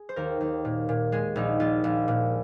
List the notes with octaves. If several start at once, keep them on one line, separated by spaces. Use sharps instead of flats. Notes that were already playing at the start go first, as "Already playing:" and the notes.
Already playing: G#4
C5
D#2 A#4
D#2
A#2
A#2
G#3 G#4
A#1 D#4
A#1 F4
A#1
A#2